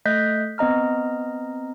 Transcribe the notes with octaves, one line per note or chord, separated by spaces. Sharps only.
A3 D#5 F#6 G6 B6
B3 C4 D#5 A#5 F6